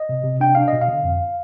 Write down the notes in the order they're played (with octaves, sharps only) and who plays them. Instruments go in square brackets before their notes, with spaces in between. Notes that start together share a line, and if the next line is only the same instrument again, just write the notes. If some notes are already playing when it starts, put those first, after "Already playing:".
Already playing: [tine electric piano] D#5
C3
C3
D4 G5
D4 F5
B2 D#5
F5
D3
F2